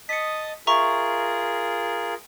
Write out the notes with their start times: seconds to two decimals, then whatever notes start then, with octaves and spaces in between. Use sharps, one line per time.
0.09 D#5 A5 D#6 B6 C#7
0.67 F4 G#4 A#4 E5 A#5 C#6